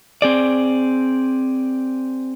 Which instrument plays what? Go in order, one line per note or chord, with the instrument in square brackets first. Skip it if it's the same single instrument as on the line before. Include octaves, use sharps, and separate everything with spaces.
[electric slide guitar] C4 G#4 D5